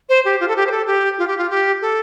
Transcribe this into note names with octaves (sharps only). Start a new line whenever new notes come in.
C5
G4
F4
A4
G4
C5
A4
G4
F4
G4
F4
G4
A4